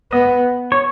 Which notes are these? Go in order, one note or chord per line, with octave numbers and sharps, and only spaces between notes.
B3 D#5
C#5